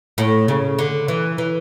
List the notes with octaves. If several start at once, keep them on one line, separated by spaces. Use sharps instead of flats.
A2
C#3
D3
E3
E3